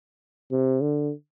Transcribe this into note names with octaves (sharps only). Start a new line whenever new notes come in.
C3
D3